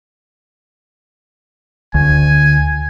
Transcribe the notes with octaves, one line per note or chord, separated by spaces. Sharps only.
D2 G#5